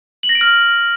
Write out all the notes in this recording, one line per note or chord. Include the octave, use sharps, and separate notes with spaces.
F#7
A#6
D7
F6